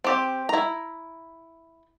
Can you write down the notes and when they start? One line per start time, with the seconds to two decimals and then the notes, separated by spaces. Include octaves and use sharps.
0.04 C4 G4
0.49 E4 A#5